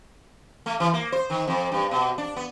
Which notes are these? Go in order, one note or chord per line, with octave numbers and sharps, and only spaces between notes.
A3
E3
A#3
C5
D#3
F2
G2
B2
D4
B3